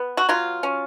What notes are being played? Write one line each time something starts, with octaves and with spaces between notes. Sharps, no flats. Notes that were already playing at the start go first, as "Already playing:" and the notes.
Already playing: B3
F#4
F#3 F4
C#4